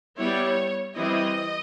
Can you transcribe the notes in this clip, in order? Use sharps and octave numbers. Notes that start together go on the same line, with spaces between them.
G3 B3 E4 C#5
E3 G3 C4 E4 D#5